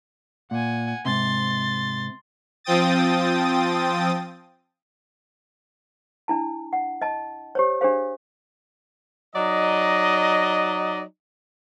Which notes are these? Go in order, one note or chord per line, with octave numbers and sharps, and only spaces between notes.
A#2 F#5 G#5
G#2 C3 C6 A6
F3 C4 G5 D#6 A6
D4 E4 A5
F#5
D#5 A5
G4 C5 C#5
D4 G4 G#4 C5 F5
F#3 D#4 D5 D#5